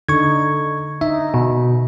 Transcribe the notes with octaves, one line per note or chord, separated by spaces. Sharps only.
D3 D#4 C#6 G#6
D#4 E5
B2